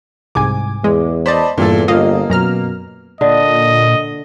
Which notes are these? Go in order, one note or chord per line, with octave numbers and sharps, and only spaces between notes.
C2 G#2 G#5 D6
E2 G#3
C5 D5 D#5 A5 B5
E2 G2 A#2 F4 A4
G1 A#3 F4 D#5 F5
F#2 B2 A#5 F6
A#2 D3 D#5